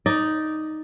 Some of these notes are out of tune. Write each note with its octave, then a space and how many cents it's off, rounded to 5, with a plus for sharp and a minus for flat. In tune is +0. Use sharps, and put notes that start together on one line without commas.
D#4 +0 D5 +0